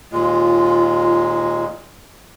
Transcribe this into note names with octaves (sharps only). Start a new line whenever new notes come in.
D#2 A#2 G#3 F4